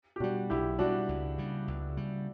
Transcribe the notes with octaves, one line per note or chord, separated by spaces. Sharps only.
G4
B2 G3 D4 F#4
B1 E4 G4
B2 G3 D4 F#4
C#2
C#3 G3
C#2
C#3 G3